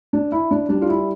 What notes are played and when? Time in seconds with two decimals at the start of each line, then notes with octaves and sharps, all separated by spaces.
0.13 D4
0.32 E4
0.51 D4
0.69 G3 D4
0.82 F4
0.89 E4